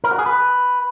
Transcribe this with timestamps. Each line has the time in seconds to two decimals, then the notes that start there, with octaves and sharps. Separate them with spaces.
0.04 A#4
0.11 F#4
0.19 G#4
0.26 B4